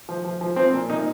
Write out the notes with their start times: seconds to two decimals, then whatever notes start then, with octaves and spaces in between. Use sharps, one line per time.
0.09 F3
0.24 F3
0.41 F3
0.56 F3 C4
0.73 A#2
0.89 A#2 D#4